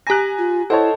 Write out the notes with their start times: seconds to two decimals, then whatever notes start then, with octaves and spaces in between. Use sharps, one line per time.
0.07 G4 G#5 A#5 F#6 A#6
0.38 F4
0.70 E4 A4 C5 C#5 D#5 F#5 A5